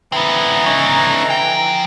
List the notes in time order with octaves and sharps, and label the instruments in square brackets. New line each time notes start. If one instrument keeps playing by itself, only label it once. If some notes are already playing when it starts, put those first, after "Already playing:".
[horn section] D3 E3 A#5 [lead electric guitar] B3 C4
[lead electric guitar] C#4 D#4
F3 G5